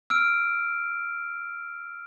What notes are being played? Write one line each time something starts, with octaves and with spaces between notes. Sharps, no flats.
E6 F6 D7